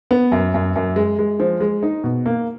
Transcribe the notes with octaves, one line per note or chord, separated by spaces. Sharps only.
B3
F#2
F#2
F#2
G#3
G#3
F3
G#3
D#4
B2
A#3